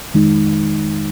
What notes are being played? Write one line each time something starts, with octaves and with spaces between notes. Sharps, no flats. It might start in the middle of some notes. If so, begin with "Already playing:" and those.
F2 D#3 G#3 D#4